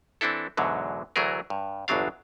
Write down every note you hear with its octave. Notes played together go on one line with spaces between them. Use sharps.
E3 C4 D4 E4 A4
E2 G#2 B2 D3 F#3
D2 E3 F#3 A3 G#4 A#4
G2
G1 E2 B2 F#3 D4 F5